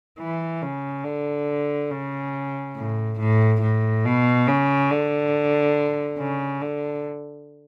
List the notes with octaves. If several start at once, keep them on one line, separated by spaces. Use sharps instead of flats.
E3
C#3
D3
C#3
A2
A2
A2
B2
C#3
D3
C#3
D3